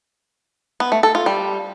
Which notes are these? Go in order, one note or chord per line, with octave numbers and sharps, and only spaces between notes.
B3
A3
A4
F4
G3